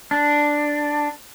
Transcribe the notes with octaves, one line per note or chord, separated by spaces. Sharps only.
D4